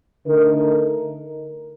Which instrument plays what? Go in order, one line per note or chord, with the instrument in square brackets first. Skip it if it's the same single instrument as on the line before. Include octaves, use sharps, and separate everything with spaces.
[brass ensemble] D3 A3 D#4 A#4